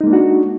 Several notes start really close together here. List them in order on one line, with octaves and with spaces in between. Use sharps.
D#4 G#3 A#3 D4 F#4